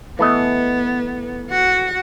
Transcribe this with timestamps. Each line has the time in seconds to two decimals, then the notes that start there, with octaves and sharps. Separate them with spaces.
0.19 E3 A3 B3 D#5
1.50 F#4 F#5